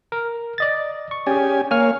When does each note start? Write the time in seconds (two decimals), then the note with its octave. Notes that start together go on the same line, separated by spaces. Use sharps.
0.12 A#4
0.58 D5 D#5 A6
1.11 C#6
1.27 C#4 G4 G#4 D5 G#5
1.71 A#3 C#5 F5 G#5 F6